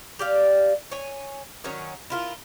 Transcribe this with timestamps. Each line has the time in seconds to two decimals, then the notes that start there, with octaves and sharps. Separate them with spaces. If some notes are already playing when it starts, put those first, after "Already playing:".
0.19 G4 D5 F5
0.92 C#5 G#5
1.64 D#3 F#3 C#4 C#5
2.10 E4 F4 A#4